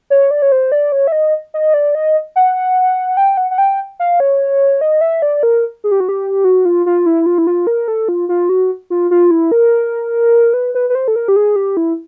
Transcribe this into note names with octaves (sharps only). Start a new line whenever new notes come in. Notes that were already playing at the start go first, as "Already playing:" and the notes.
C#5
D5
C#5
C5
D5
C#5
E5
D#5
D#5
D5
D#5
F#5
G5
F#5
F#5
G5
F5
C#5
D#5
E5
D5
A#4
G#4
G4
F#4
G4
F#4
F4
F4
E4
F4
E4
F4
A#4
A4
F4
F4
F#4
F4
F4
E4
A#4
B4
B4
B4
C5
A4
A#4
G4
G#4
G4
E4